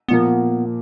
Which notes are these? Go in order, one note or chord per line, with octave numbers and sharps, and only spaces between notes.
A#2 F3 A#3 B3